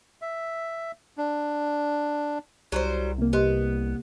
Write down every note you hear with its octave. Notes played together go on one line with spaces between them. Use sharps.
E5
D4
C2 F#3 G3 C5
C3 A#3
B3 G4 D#5 C6